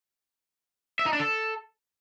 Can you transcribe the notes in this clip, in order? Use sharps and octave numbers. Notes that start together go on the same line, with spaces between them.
E5
D#4
D4
A4